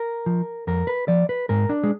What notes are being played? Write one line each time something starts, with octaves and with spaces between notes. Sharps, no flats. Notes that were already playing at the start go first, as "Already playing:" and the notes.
Already playing: A#4
F3
F2 A#4
B4
F3 D5
B4
G#2 A#4
D4
G#3